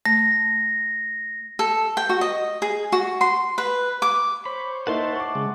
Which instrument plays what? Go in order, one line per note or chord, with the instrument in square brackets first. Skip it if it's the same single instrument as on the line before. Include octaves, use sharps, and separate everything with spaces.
[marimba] A3 [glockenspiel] A#6
[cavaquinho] A4
G5
F#4
D#5
G#4
F#4
C6
B4
D6
[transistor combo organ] C5 C#5 [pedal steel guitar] B5
[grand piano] A#3 D#4 E4 [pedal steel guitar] F#5 A5 C6
[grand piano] C#6 D6
[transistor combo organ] C#3 G#3